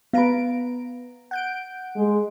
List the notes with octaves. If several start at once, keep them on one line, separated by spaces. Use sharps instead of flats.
B3 B4 F5 A#5 D7
F#5 G6 D7
G#3